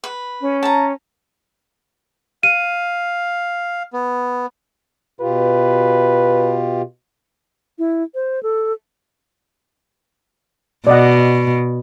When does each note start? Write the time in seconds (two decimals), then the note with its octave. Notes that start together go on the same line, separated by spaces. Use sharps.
0.04 B4
0.41 C#4
0.63 A5 A#5
2.43 F5 D#7
3.93 B3
5.21 B2 F4 G4 B4
7.79 E4
8.15 C5
8.43 A4
10.87 B2 D5 D#5 F#5